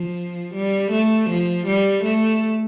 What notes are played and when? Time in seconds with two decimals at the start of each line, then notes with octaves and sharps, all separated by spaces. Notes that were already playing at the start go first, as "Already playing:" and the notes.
Already playing: F3
0.54 G3
0.91 A3
1.30 F3
1.67 G3
2.04 A3